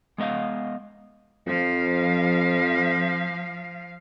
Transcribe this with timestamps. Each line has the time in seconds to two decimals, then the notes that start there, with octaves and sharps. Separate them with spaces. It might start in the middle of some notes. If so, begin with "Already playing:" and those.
0.18 G#3 B3 D#5 F5
1.46 F2 F3 F5